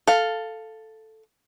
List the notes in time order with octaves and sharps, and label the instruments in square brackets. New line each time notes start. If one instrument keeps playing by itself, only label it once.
[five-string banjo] A4 F5